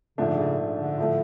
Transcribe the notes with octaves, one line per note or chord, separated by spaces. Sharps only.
A#1 G#2 C#3 F3 A3 D4
D3
C#3
D3
A2 F3 A3